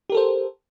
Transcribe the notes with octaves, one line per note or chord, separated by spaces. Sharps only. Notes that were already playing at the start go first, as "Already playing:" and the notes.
G4 A4 A#4 C5